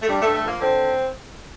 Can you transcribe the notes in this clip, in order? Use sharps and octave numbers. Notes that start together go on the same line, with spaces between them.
A3
G2 G3
A3
G2
A3
F3 A#3
D3 C4